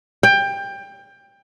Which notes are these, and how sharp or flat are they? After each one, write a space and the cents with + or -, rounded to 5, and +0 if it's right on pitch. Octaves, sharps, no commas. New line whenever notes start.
G5 +20